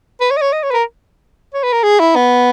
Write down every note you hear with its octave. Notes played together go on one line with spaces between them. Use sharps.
B4
C#5
D#5
C#5
D#5
C#5
B4
A#4
C#5
B4
A#4
G#4
E4
B3